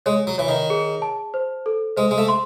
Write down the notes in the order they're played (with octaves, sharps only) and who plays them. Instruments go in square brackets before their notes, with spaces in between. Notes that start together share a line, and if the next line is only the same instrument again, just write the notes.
[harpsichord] G#3 [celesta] C#5
[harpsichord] F#3
[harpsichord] E3 [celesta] C#5
[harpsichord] D#3
[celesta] G#4
A5
C5
A4
[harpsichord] G#3 [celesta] C5
[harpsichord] G#3
A3
[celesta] C6